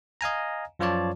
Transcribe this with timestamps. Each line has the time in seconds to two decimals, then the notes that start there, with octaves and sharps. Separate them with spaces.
0.21 D#5 F5 G#5 A#5
0.79 F#2 F3 F4 C#5 D5 A5